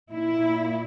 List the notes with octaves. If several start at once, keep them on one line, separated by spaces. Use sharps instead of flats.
A#2 E4